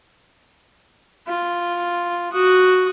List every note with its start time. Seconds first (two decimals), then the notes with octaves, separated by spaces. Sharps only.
1.28 F4
2.32 F#4 D#6